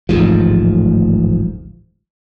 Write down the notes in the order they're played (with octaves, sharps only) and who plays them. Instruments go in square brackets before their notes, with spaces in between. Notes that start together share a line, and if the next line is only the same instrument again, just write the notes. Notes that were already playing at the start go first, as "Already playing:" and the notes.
[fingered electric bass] D1 A1 G#2 F3